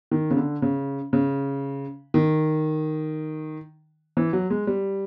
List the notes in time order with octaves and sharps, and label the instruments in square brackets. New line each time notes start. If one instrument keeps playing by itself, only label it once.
[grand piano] D#3
C#3
D3
C#3
C#3
D#3
E3
F#3
G#3
G3